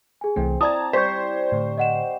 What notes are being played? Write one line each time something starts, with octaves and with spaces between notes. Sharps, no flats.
G#4 G#5
C2 E3 A3 C4
E4 D5 A5 A#5 D#6 G#6
G3 C5 A#5 C#6 G6 B6
A2 D3
D#5 F#5 E7